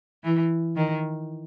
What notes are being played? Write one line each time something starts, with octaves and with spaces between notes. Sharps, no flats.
E3
D#3